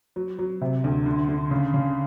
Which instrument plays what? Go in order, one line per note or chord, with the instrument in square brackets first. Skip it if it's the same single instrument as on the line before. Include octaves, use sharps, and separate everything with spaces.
[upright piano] F#3
F#3
C3
D2
D3
D3
C#3
C#3